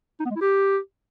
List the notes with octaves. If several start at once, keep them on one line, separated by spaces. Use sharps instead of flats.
D#4
B3
G#3
E4
G4